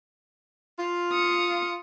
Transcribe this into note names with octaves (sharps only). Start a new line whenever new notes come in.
F4
D#6 C#7